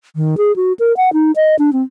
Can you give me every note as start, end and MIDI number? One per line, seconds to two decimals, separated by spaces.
0.16 0.35 51
0.38 0.55 68
0.56 0.73 66
0.79 0.95 70
0.97 1.13 78
1.13 1.31 63
1.36 1.55 75
1.59 1.70 62
1.73 1.82 60